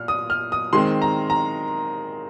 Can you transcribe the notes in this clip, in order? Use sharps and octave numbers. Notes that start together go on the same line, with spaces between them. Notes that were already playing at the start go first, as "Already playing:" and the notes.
Already playing: A#2 F6
D#6
F6
D#6
D#3 G#3 C4 C6
A#5
A#5